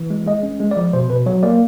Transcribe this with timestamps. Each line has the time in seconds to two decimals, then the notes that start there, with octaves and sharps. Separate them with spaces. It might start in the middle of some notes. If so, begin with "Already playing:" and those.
Already playing: E3
0.10 G#3
0.26 G#3 D#5
0.43 C#4
0.60 G#3
0.71 D5
0.77 F3
0.93 B2 C5
1.10 B2 B4
1.26 F#3 C#5
1.43 A#3 D5